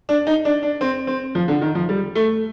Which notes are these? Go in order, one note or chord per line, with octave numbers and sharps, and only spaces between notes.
D4
D#4
D4
D4
C4
C4
F3
D3
D#3
F3
G3
A3